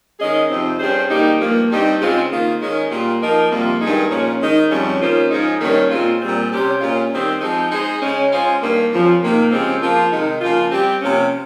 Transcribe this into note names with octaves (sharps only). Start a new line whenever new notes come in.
D#3 G#3 C#4 G#4 D#5
F2 C3 F3 C4 D#4
G2 G3 C#4 G#4 C5
D#3 G3 A#3 D#4 G4
G2 F3 A#3
G2 G3 C4 D#4 G4
C#3 G#3 C4 F4
D#3 A#3 F4
D#3 G#3 C#4
A#2 G3 A#3 F4
F3 A#3 D#4 A#4 D#5
F2 C3 G3 A#3 F4
G2 D#3 G#3 D#4 G#4
A#2 F3 A#3 C#4
D#3 G#3 D#4
F2 C#3 G3 C#4
D#3 A#3 C#4 F4 C5
G#2 F3 G#3 D#4 G#4
G2 D#3 G3 A#3 C#4
A#2 G#3 C4 F4
A#2 G3 C4
C3 G3 C#4 G4 C5
A#2 G#3 C#4 F4
D#3 G3 C4
F3 G#3 C4 D#4
G#3 D#4 G#4 C5 D#5
C#3 G#3 C#4
G#3 C#4 F4 C5
G2 D#3 A#3
F2 C#3 F3
C3 D#3 A#3 D#4
C#3 F3 G#3 C4 G4
F3 A#3 F4
C3 D#3 G#3 D#4
C#3 F3 A#3 F4
G3 C4 G4
C3 F3 A#3 C#4